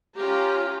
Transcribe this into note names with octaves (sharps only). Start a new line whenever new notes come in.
C#4 F4 G4 A#5